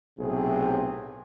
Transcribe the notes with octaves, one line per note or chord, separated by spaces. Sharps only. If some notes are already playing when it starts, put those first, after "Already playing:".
B1 A2 C3 C4 G#4